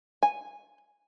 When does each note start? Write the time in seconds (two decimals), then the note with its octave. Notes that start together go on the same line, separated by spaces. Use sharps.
0.23 G#5